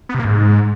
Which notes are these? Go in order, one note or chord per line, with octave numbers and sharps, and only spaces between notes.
B3
C3
A#3
G#2